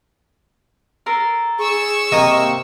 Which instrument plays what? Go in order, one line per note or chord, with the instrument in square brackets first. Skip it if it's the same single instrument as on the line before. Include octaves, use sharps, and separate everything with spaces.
[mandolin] A4 A#4 C6
[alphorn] G#4 [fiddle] C#6 E6
[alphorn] C3 [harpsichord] A#3 [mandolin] D#5 G6